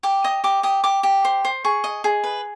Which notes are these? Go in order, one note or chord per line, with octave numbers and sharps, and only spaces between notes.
G4 D6
D#5 D#6
G4 D6
G4 D#6
G4 D6
G4
C5
C5
G#4 C#6
D#5
G#4
B4